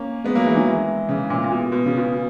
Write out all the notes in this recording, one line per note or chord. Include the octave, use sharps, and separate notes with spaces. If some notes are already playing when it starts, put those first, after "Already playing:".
Already playing: A#3 C#4
G#3 B3
F#3 A#3
E3 G#3
D#3 F#3
E3 G#3
C#3 E3
A#2 C#3
A#2
B2
B2
C#3
B2